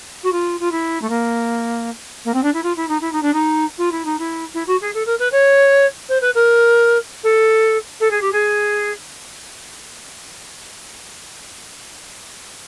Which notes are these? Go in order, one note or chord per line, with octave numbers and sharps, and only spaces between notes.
F#4
F4
F4
E4
A3
A#3
A#3
C4
D4
E4
F4
E4
D#4
E4
D#4
D4
D#4
F4
E4
D#4
E4
E4
F#4
G#4
A4
A#4
B4
C#5
C5
B4
A#4
A4
A4
G#4
G4
G#4